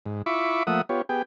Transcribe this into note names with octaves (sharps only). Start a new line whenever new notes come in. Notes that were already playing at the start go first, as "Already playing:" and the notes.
G#2
E4 F4 E5 B5 C#6 D6
F3 A3 A#3 E5 F#5 D#6
B3 F4 G4 C#5
B3 G4 G#4 G5